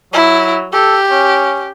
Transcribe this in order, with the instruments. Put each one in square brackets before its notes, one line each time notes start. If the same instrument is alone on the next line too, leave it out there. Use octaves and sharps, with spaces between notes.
[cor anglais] F#3 [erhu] E4
[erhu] G4 [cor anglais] A4
[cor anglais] C#4